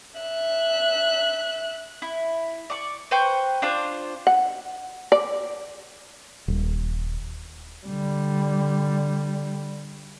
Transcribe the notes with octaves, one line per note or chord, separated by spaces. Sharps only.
E5 F#6
E4
D5 C#6
B4 C5 G5 C#6
D4 F4 C5
F#5
D5
D#1
D3 G3